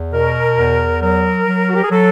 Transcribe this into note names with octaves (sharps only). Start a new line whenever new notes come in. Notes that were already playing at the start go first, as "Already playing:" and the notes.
Already playing: E2
B2 A#4
E2
F#3 A#4
F#3
F#4
G4
G#4
F#3 A4